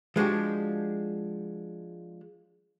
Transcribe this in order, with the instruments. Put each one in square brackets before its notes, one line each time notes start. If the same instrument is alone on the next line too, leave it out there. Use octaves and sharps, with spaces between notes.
[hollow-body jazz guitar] F3 G#3 D4 F#4 G4